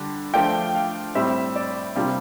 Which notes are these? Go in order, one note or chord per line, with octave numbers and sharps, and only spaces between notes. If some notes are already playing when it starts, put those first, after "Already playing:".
Already playing: D3 G3 D4
F3 A3 D4 F4 G5
F5
A2 G3 C4 E5
D5
C3 G3 A#3 D4 F4